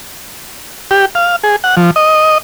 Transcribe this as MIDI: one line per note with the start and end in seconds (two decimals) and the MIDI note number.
0.91 1.06 67
1.15 1.36 77
1.43 1.56 68
1.64 1.75 78
1.77 1.91 53
1.96 2.38 75